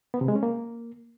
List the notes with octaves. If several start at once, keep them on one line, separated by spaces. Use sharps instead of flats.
B3
C3
G#3
C#4
A#3